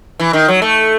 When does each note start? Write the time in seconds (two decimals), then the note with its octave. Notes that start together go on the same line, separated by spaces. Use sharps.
0.19 E3
0.33 D#3
0.48 F#3
0.62 A3